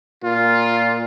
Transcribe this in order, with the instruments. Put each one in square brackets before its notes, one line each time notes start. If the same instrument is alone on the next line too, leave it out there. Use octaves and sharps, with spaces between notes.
[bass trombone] A#2 [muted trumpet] F4